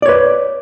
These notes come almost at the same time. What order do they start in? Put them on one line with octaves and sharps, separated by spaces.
D5 C#5 B4